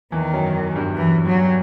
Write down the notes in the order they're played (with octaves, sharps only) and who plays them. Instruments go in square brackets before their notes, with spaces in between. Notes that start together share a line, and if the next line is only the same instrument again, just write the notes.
[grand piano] E2 E3 [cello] D#3
[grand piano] F#2 F#3
G2 G3
[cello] E3
F#3